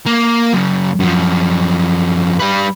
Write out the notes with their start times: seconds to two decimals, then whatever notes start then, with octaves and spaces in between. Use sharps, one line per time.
0.06 A#3
0.54 F#2 C#3
1.00 F#2 F3
2.40 G3 B4